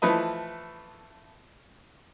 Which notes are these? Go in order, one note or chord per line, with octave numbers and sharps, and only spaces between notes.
E3 F3 A3 B4 D#5